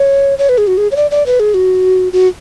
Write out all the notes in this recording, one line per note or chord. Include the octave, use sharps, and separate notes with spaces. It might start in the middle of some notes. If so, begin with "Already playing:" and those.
Already playing: C#5
C#5
B4
G#4
F#4
G#4
C#5
D5
D5
B4
G#4
F#4
F#4